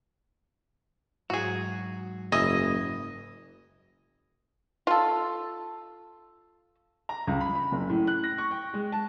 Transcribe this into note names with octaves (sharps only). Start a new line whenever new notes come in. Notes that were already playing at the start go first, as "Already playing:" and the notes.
G#2 F#3 F#4 G#4 A#5
F#1 E3 D#5
F4 A4
A#5
C#2
B5
B5
F#1
A2
F#6
A#6
C#6
G5
G#3
A5